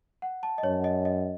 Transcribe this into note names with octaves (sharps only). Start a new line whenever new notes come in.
F#5
A5
D#5
F#2 C#5
D#5
D#5